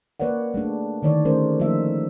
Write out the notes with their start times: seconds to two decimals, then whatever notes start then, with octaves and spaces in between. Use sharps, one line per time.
0.20 A#3 B4 C#5 D5 F#5
0.54 G#3 A3 D4
1.02 D3 D#3 C#5 D5
1.25 G#3 A3 C#4 A#4 C5
1.60 F3 A3 A#3 D#4 E5